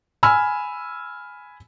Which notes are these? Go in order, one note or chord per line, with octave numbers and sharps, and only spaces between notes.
G#5 B5 E6 F6